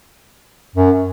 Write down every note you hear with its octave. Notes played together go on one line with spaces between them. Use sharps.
F#2